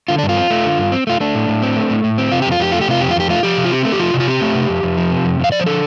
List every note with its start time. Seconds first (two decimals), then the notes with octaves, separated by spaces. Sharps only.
0.08 D3 F4
0.19 G2 D4
0.29 F4
0.37 C4
0.50 A3
0.64 D3
0.78 G2
0.92 C4
1.07 A3 F4
1.20 A3 D4
1.35 A2
1.48 A2
1.62 C4
1.76 A3
1.90 A2
2.04 A2
2.18 C4
2.32 C3 F4
2.42 F2 G4
2.52 F4
2.60 F2 G4
2.72 A3 F4
2.81 G4
2.88 C3 F4
3.01 F2 G4
3.11 F4
3.16 F2 G4
3.29 A3 F4
3.43 F3 G4
3.57 C3
3.65 F4
3.71 C4 G4
3.85 A3
3.92 G4
3.99 F3 F4
4.14 C3
4.20 F4
4.28 C4 G4
4.42 A3
4.55 C3
4.69 F2
4.83 F2
4.97 F3
5.12 C3
5.25 F2
5.40 F2 F5
5.52 F3 D5
5.60 C5
5.66 D3 A4